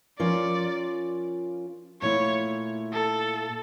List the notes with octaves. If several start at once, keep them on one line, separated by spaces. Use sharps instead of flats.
F3 C#4 F4 A#4 C#5 D5
A#2 A3 E4 C#5
A4